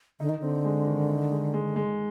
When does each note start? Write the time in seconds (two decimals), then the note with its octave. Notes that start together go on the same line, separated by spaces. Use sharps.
0.20 D3 D#4
0.29 D#3
0.39 D3 C4
0.65 G#3
0.87 D#3
1.09 D#4
1.31 G#3
1.54 G#3
1.76 G#3